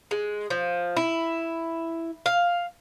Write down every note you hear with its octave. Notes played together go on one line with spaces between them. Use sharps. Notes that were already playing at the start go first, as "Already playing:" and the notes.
G#3
F3
E4
F5